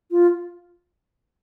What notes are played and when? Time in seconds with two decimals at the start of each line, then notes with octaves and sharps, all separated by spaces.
0.11 F4